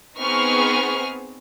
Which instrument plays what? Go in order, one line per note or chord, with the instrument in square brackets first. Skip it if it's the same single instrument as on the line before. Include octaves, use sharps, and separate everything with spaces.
[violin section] B3 C4 D#4 G#4 C#6 F6